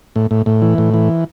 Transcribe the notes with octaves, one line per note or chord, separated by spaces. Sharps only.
A2
A2
A2
E3
A2
E3